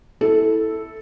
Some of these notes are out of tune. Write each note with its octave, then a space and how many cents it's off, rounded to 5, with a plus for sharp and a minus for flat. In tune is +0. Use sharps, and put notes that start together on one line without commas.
E4 -15 A4 +0